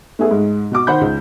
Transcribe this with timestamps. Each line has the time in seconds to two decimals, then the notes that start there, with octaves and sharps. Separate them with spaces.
0.19 A3 B3 G#4 A4
0.31 G#2 G#3
0.72 B2 F#4 D6
0.87 D#3 C5 F#5 B5 G6
1.01 C#2